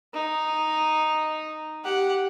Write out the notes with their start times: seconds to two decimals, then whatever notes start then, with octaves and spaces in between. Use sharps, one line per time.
0.14 D#4
1.84 G4 F#5